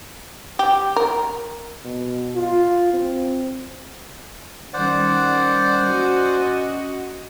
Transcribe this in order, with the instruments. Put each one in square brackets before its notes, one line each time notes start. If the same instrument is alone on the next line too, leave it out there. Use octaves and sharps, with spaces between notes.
[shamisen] G4
A#4
[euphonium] B2
F4
C4
[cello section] D#3 G3 [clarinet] C#4 [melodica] C5 D5 F#5
[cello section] F#4 D#5